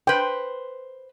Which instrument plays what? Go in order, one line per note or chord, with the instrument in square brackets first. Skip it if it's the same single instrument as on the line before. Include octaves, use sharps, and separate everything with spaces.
[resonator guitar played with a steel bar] B4 C5 [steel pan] G5